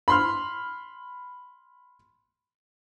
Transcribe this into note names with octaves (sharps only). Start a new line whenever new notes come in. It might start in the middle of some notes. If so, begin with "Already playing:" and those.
B5 C6 F6